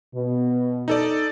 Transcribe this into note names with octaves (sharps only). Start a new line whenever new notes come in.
B2
D#4 A4 D5